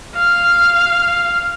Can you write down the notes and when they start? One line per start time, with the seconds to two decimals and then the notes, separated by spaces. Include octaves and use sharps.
0.16 F5